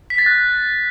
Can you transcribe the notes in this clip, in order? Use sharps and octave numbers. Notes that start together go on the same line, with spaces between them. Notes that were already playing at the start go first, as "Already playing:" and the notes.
B6
A6
F#6